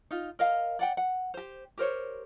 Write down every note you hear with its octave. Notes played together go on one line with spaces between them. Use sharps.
D#4 F4
A#4 D#5 F5
D5 F#5 G5
F#5
G4 C5
G4 A#4 C5 C#5